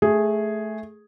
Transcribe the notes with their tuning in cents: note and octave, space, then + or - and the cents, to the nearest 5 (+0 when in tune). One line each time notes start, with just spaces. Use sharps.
A3 -10 G#4 +0